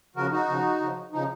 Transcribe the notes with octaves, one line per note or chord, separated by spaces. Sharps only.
C#3 F3 F#4 A#4
D#4 F#4
C#3 F3
C#3 F3
C#3 F3 D#4